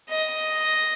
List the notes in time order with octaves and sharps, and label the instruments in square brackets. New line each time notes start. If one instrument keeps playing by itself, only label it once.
[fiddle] D#5